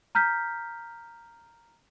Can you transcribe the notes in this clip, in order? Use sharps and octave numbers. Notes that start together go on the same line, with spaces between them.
A#5 F6 G6 B6